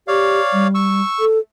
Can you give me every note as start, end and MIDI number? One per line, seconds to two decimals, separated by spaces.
0.08 0.40 67
0.08 0.67 73
0.08 0.67 74
0.08 0.67 77
0.53 1.02 55
0.75 1.25 85
0.75 1.25 88
1.20 1.39 69